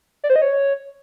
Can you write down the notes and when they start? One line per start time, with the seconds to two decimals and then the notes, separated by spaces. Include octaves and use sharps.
0.24 D5
0.30 C5
0.36 D#5
0.42 C#5